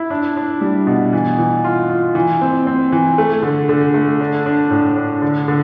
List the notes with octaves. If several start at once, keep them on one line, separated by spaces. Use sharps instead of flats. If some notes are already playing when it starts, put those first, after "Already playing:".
Already playing: E4
D4
D4
G3
B2
E3
E3
F4
F4
E3
C4
C4
E3
A3
D3
D3
A3
D4
D4
A2
D4
D3
D3